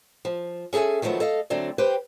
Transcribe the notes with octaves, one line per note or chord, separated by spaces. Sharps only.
F3
C#4 G#4 A4 E5 G#5
D#3 F3 F#3 A3 B3
A4 D#5 F5
D2 D3 F#3 A3 C4 D5
G4 B4 C5 G5